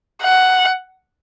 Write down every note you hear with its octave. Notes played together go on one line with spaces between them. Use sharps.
F#5